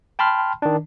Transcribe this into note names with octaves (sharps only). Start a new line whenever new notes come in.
G5 A5 B5 C6 F6
D#3 D4